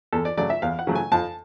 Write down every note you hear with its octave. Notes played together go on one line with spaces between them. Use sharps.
E2 A4
D5
C#3 F#3 A3 D5
E5
E2 F5
F#5
C#3 F#3 A3
G#5
F2 A5